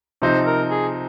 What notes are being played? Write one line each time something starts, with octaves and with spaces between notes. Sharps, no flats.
C3 F3 C4 D#4 C5
A#4
G#4